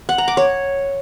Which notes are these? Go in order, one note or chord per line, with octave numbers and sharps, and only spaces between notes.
F#5
A#5
D6
C#5